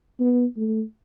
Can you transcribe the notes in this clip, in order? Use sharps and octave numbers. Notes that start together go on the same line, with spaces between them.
B3
A3